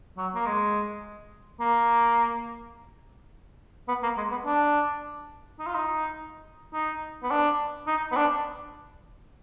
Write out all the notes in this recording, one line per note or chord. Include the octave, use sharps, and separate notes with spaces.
F#3
A#3
G#3
A#3
B3
A#3
G#3
B3
D4
D#4
F4
D#4
D#4
B3
D4
D#4
B3
D4